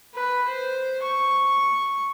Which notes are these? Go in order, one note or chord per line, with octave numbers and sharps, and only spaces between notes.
B4
C5
C#6